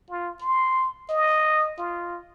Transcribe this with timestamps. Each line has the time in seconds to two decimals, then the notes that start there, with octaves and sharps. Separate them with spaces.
0.10 F4
0.41 C6
1.10 D#5
1.79 F4